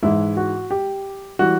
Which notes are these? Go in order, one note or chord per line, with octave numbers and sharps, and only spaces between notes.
G#2 E3 G#3 E4
F#4
G4
E3 G3 F#4